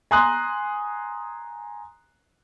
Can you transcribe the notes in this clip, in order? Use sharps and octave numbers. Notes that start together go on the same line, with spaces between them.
G#5 A#5 C6 D#6 F#6